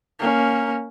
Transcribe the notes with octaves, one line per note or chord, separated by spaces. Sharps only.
A#3 C#4